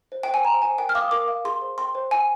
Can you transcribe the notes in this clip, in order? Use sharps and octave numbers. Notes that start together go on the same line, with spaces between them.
C5
G5
C5
G#5
C5 A#5
C5 G#5
A#4 G5
F6
F5 D6
D#6
A#4 D6
F5
G#4 C6
C5
G5 C6
C5
G5 G#5